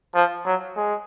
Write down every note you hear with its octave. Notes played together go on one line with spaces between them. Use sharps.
F3
F#3
G#3